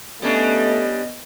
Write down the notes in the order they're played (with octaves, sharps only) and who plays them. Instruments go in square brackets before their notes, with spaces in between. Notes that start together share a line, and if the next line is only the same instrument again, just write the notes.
[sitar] G3 C#4 D4 [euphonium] A3 [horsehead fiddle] B3 D#5